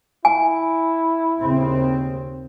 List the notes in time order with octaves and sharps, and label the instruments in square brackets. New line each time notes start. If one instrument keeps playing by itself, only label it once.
[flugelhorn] E4 [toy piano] G#5
[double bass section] D#2 C#3 C4